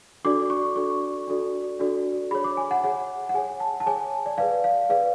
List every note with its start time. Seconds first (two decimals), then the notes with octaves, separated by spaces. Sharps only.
0.25 D4 F#4 A4 D5 D6
0.50 C#6
0.76 D4 F#4 A4 D5 C#6
1.27 D4 F#4 A4 D5
1.80 D4 F#4 A4 D5
2.31 G#4 C#5 B5
2.44 D6
2.57 G#5
2.71 F#5
2.83 G#4 C#5 F#5
3.29 F#5
3.34 G#4 C#5 G#5
3.60 A5
3.80 A5
3.86 G#4 C#5 G#5
4.26 D5
4.38 G#4 B4 D5 F5
4.64 F5
4.89 G#4 B4 D5 F5